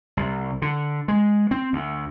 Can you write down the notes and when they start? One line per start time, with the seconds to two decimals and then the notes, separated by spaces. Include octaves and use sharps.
0.17 C2
0.62 D3
1.08 G#3
1.51 C4
1.73 D2